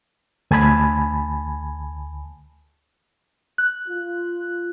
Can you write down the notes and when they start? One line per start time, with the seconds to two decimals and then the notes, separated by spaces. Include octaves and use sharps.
0.51 D2 G#5 A5 B5 G#6
3.58 F#6
3.87 F4